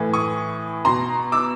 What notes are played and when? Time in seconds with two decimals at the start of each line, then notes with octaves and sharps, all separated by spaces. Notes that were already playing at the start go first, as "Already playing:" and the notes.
Already playing: A2 E3
0.13 C#6 D#6
0.85 B2 A#5 C6
1.32 D6 E6